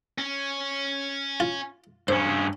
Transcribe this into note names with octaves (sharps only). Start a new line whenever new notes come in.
C#4
F4
G2 C#4 C5